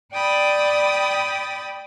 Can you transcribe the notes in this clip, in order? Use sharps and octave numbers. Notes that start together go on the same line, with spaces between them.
D5 G5 B5 D#6 A6